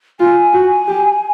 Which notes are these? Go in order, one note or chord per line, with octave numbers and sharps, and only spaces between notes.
F4 G#5
F#4
G4